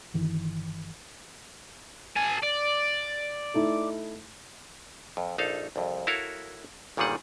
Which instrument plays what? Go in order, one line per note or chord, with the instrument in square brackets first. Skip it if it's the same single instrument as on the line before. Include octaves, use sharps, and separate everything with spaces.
[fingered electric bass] G1 D#3 E3
[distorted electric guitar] A4 G#5
D5
[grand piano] A3 D#4 E4
[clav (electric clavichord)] F2
A#1 D#4 A4 F5
C2 F2
E4 F#4 A4 A#4 C#5 F5
G1 A#2 D#3 G3 G#4 F#5